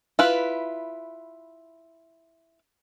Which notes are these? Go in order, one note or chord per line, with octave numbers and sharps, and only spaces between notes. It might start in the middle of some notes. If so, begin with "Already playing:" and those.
E4 F4 B4